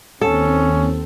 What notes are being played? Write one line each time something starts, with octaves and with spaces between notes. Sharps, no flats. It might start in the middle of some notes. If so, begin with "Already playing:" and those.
D#2 C4 C#4 A4